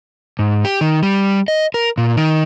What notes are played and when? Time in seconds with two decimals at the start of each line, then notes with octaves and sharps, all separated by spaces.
0.39 G#2
0.65 G4
0.81 D#3
1.03 G3
1.48 D#5
1.74 A#4
1.98 A#2
2.17 D#3